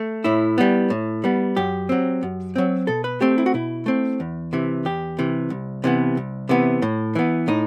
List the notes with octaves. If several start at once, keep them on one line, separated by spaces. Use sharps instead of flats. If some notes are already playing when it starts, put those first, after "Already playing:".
Already playing: A3
A2 E4
G3 B3
A2
G3 B3
F#2 G4
F#3 C4
F#2
F#3 C4
B2 A4
B4
A3 C4 G4
E4
F#4
B2 E4
A3 C4
E2
C3 E3
E2 G4
C3 E3
C2
C3 E3 B3
C2
C3 E3 B3
A2
E3 B3
A2 D#4